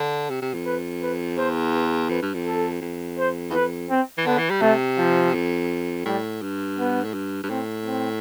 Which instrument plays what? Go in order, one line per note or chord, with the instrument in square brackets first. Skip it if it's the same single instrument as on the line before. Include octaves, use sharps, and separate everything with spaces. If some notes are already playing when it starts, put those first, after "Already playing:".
Already playing: [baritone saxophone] D3
C3
C3
F2
[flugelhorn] B4
B4
[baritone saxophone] E2 [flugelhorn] C5
[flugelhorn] B4
[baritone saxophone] F2 [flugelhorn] B4
[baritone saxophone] G2
F2
[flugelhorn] A4
[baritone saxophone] F2
[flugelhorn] C5
[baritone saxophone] E2
[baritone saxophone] F2 [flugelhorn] B4
[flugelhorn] C4
[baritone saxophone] E3
[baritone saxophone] D3 [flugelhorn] B3
[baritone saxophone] E3
G3
[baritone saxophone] C3 [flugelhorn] A3
[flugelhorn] F3
[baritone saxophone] F2
[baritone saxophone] A2 [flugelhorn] G3
[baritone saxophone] G2
[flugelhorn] B3
[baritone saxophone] A2
G2
G2
[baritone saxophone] A2 [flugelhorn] C4
[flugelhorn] C4